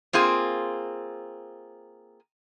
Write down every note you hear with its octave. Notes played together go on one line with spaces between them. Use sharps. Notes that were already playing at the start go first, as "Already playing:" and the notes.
A#3 C4 F4 G#4